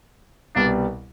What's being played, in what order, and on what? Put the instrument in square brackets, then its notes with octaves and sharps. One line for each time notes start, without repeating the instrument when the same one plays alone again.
[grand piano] C2 B2 G3 B3 [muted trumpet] D4